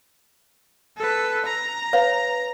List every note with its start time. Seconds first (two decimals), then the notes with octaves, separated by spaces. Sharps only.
0.97 A4 B4
1.45 A#5
1.93 B4 C#5 F5